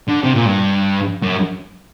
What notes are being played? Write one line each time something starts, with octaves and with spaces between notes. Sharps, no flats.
D3
C3
A#2
G2
F#2